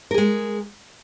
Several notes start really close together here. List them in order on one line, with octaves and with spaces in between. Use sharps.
A#4 G#4 G#3